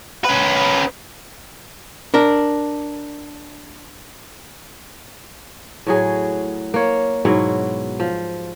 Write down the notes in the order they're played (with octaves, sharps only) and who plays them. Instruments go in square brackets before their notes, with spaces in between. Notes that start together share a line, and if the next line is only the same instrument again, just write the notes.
[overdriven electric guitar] C#4 B4
[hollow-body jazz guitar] D4 A#4
[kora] A2 F#3 G#4
A#3 C#5
G#2 B2 F#3 E4
F3